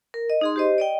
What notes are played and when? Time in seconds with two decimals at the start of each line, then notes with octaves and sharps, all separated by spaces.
0.14 A#4
0.30 D#5
0.41 D#4 G#4 C6
0.56 G4 C5 D#5
0.78 D5 D#5 G5